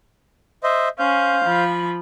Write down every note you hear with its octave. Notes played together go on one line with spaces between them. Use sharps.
C5 D#5 E5
C#4 C5 F5 G6
F3 B5